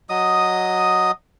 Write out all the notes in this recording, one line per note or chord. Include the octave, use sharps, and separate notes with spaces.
F#3 D#5 D#6